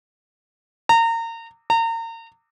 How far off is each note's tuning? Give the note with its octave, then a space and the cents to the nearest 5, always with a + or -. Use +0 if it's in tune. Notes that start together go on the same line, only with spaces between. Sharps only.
A#5 -30
A#5 -35